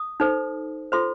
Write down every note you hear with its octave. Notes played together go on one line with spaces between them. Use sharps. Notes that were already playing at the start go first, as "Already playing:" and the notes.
Already playing: D#6
D#4 A4 C5
F4 A4 C5 C6